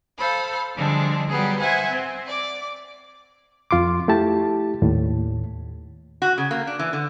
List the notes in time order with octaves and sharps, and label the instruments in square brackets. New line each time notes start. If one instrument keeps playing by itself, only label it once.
[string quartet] A4 C5 F5 B5
D3 F3 G3 G#3 C4 D4
F#3 G3 B3 G4 G#4
C5 E5 F#5 G#5 G#6
C4
D5 D6
[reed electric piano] F2 F4 C6 D6
A3 E4 G4 A5
D#2 A2
[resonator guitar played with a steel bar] F#4
C#3
A#3
D4
E3
D3